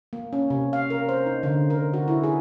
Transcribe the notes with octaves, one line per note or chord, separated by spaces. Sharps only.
A#3
C#4
C3
F5
A#4
C5
D#4
D3
A#4
F#4
E4
G#4